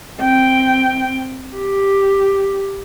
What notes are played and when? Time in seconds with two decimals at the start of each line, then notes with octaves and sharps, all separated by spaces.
0.19 C4 G5
1.55 G4